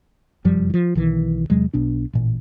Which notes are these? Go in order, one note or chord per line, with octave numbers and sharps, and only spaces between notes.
F1 F#2 F3 G3
E3 F3
B1 D#3 E3
E2 C3 F#3 G#3
B1 B2 D4
A1 A#2